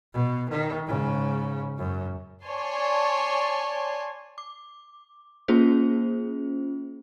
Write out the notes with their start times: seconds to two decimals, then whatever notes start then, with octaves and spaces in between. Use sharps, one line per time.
0.13 B2
0.50 D#3
0.87 G#2 C#3
1.78 F#2
2.45 C#5 D5 G#5 A5 C6
4.38 D6
5.48 A#3 C#4 F4 G#4 C5